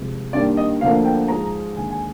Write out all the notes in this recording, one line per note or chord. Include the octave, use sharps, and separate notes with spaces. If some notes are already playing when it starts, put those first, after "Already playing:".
Already playing: C2 C3 F3 G#3
G2 D#3 G3 A#3 D5
D#5
D2 D3 F3 A#3 F5
G5
G#2 F3 G#3 A#5
D#2 D3 G#3 G#5
G#5